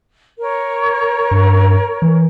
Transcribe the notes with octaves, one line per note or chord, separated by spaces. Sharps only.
A#4 C#5
G2
E3